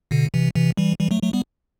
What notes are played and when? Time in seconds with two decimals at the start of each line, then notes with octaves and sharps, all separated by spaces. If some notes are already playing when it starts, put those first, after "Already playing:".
0.11 B2 D3
0.34 C3 E3
0.55 C3 E3
0.77 E3 G3
1.00 E3 G3
1.11 F#3 A3
1.22 F#3 A3
1.33 G3 B3